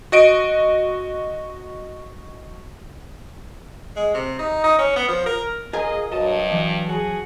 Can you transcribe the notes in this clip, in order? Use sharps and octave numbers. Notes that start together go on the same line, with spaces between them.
F#4 D#5 D7
G#3
C3
D#4
D#4
C#4
B3
F3
A#4
F4 G#4 A#4 D#5 G#5
G2 F#3 D#5 A5
E3
F#4 G#4